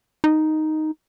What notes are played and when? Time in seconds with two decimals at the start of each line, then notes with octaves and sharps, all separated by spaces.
0.24 D#4